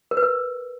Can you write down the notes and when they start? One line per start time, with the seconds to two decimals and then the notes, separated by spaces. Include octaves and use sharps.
0.11 A#4
0.17 B4
0.23 A#4